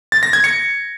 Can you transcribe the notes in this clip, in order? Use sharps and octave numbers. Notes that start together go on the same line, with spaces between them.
A6
A#6
G#6
C#7